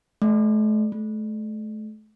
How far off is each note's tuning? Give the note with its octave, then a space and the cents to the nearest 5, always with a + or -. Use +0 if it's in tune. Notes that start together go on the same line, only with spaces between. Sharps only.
A3 -40
A3 -35